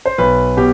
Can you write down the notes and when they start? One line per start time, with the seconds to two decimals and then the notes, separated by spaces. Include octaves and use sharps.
0.06 C5
0.18 B1 B4
0.57 B2 G4